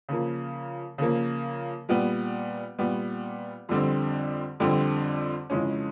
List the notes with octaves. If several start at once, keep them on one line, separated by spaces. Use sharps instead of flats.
C#3 F3 A#3
C#3 F3 A#3
A#2 G3 B3
A#2 G3 B3
F2 D3 G3 C4
F2 D3 G3 C4
F2 C#3 E3 G#3 C#4